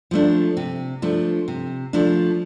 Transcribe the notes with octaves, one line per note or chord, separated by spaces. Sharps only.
F3 A3 D4
C3
F3 A3 D4
C3
F3 A3 D4